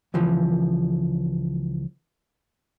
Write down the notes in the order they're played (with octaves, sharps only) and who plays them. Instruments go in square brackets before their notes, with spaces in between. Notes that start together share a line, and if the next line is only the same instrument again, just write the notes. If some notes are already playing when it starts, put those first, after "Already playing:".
[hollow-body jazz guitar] C#2 E3 F3